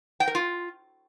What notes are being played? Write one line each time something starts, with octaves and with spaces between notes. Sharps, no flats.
G5
A#4
F4